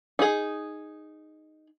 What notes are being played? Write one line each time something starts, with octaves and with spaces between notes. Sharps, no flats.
D#4 G#4